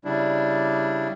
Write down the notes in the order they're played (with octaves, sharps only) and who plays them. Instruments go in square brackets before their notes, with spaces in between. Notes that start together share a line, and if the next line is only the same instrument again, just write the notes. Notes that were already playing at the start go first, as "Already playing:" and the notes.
[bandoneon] C#3 G3 D4 E4